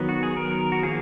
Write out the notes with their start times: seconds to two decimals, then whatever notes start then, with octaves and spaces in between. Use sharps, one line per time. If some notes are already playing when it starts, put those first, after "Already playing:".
Already playing: D#3 F#3 B3
0.09 F#4
0.23 G#4
0.37 A#4
0.72 F#4
0.83 F3 A#3 G#4